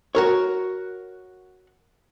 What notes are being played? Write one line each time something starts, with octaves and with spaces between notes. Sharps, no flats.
F#4 A#4 C#5